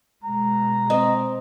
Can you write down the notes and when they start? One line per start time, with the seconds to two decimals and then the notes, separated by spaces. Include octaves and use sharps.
0.24 B2 G#3 A#5
0.90 C4 D#5